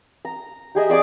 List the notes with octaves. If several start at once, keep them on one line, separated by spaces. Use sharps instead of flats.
A#5
G4 G#4 D#5 E5
G#4 D5 G#5 D6